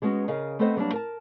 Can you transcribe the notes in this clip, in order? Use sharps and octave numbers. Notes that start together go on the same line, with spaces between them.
G3 G#3 B3 C#4 F#4
C#3 G#4 A#4 D#5 F5
A3 B3 C4 A4 C5 D#5
F#3 G3 A#3 B3 C#4 D4
A#4 A5